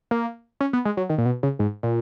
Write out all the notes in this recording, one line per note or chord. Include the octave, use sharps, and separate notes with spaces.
A#3
C#4
B3
G#3
F#3
D#3
A#2
B2
C#3
G#2
A#2